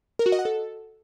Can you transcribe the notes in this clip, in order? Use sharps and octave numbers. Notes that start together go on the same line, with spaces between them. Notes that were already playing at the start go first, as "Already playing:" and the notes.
A#4
F#4
D#5
F#5
A4